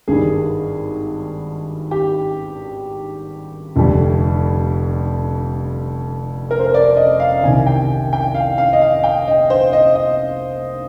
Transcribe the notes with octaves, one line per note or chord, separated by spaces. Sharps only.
G#1 G2 D#3 G3 G#4
G4
F1 F2 D3 G3
A#4
C5
A#4
D5
D#5
F5
C2 C3 D#3 G#5
G5
G5
F5
F5
D#5
F5
G5
D#5
C5
D#5
D#5